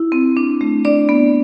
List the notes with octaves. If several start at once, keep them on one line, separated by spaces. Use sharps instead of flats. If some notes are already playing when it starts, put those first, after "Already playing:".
Already playing: E4
C4
D4
A3
D4 D5
B3